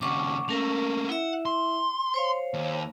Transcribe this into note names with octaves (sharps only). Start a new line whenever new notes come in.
D#2 C#3 F#5 C#6 D6
A3 A#3 C#4 A#4
E4 E5 F#5
C6
C5 C#5 F5
D#2